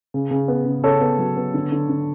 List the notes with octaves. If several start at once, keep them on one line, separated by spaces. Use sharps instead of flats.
C#3
C#3
B3
C#3
C#3 A4 C#5
B3
F#3
B3
D3
D3
D3